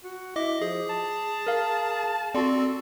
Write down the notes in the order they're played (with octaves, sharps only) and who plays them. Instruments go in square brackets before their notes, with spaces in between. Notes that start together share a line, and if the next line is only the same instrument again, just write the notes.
[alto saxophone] F#4
[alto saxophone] E4 [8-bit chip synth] D#5 D6
[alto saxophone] F3 [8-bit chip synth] G#4
[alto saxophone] A5
[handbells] A#4 F5
[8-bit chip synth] C4 F#4 [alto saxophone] A4 [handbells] D5 C6